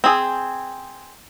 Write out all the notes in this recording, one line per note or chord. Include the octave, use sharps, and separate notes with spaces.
C4 G#4